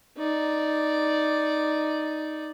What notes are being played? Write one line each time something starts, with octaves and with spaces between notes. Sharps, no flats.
D#4 D5